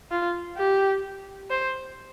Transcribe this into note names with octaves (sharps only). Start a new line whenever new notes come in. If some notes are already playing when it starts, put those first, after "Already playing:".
F4
G4
C5